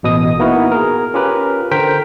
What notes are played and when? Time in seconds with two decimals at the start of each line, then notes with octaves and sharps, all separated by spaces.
0.03 A1 B2 D#5 D#6
0.39 A#3 B3 D#4 E4 F#4 A#4
0.72 G#4 A#4
1.14 C#4 F4 G4 A#4 B4
1.72 D3 A#4 C5 G5 B6